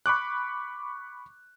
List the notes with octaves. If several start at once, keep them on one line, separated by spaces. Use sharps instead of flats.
B5 C#6 D6 F#6